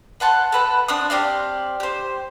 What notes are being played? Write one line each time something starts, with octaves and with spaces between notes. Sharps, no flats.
B4 F#5 A5 C6
A4 B4 F#5
C4 D4 C#6 D#6
C4 G4 D5 F5
G4 C5